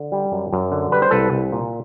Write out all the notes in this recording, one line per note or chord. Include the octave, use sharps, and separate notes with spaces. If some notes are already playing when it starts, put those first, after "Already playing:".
Already playing: D3
G3
F#2
F#2
D3
G3 B4
C5
C2 A4 B4
C2
A#2